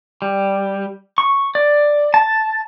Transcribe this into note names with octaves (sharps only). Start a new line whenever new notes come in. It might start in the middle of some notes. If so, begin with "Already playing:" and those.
G3
C#6
D5
A5